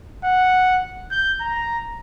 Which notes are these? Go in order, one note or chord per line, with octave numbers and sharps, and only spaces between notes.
F#5
G6
A#5